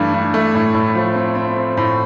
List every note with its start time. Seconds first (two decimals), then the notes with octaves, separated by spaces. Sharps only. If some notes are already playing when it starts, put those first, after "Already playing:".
Already playing: G2 E3 A3 D4
0.14 G2
0.34 A3
0.55 A2
0.74 A2
0.95 F3
1.15 C4
1.35 C4
1.56 C4
1.77 A2